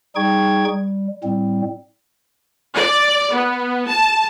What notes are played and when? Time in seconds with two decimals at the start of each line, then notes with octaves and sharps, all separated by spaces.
0.16 G3 D#4 G#4 G5 C#6 G#6
0.69 G3
1.24 A2 G3 C4
2.75 D5
3.35 B3
3.89 A5